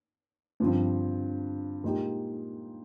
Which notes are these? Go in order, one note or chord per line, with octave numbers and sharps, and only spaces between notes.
G2 D3 F3 C4
A#2 G#3 D#4 G4